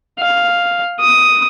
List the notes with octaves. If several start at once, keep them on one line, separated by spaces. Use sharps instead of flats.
F5
D#6